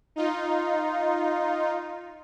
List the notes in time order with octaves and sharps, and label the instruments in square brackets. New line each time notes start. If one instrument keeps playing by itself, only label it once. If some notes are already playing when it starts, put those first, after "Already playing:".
[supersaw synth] D#4 F4